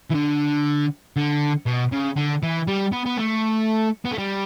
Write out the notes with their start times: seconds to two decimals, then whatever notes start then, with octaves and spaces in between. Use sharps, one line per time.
0.11 E3
0.15 D3
1.16 D3
1.66 B2
1.92 C#3
2.16 D3
2.43 E3
2.67 G3
2.92 B3
3.06 B3
3.18 A3
4.05 B3
4.12 A3
4.18 G3